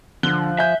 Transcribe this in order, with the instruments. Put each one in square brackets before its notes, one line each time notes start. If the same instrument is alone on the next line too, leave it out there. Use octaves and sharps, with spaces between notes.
[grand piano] D3 F#6 G7 [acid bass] F3
[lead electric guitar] E5 [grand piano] G#5 G6